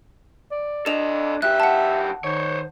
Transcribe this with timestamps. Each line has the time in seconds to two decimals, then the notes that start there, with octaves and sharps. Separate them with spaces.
0.51 D5
0.86 D4 A4 D#5 E7 F7
1.42 F#2 G4 E5 F#6
1.60 F#5 A5
2.24 D#3 C5 C#5